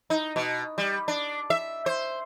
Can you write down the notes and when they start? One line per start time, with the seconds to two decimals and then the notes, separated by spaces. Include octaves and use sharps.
0.10 D#4
0.36 B2
0.78 G3
1.08 D4
1.50 E5
1.86 C5